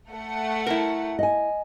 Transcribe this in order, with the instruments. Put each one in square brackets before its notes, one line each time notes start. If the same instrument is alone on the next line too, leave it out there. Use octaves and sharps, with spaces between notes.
[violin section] A3 F#5
[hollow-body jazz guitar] E4 A#4
[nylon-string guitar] D#5 G#5